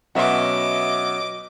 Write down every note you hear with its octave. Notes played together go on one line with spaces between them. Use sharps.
B2 F#3 C#4 B4 D#5 E5 F#5 D6